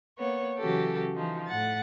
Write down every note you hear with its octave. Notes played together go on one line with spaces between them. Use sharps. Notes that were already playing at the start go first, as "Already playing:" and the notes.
A#3 B3 C#5
C#3 E3 F#3 F#4 G4 A4
E3 F3 D#4
A2 F#5 A6